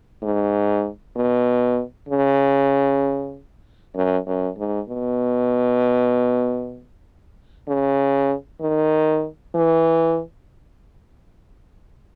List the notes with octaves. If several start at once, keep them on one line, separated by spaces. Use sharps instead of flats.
G#2
B2
C#3
F#2
F#2
G#2
B2
C#3
D#3
E3